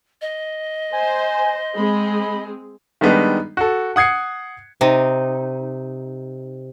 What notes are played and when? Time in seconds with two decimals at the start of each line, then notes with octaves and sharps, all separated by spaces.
0.22 D#5
0.93 C5 G#5
1.76 G#3 C4 G#4 B5
3.01 D#3 G3 G#3 B3 D4 D#4
3.57 F#4 A4
3.96 F#5 D#6 G#6 C7 C#7
4.81 C3 D#4